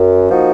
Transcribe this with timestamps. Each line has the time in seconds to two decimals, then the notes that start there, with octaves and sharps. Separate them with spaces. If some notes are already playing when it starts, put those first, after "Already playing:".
Already playing: F#2
0.29 F3 A#3 D#4 F#4